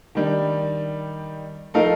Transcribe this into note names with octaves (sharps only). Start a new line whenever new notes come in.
D#3 G3 D4
F3 A3 D#4 A#4 F5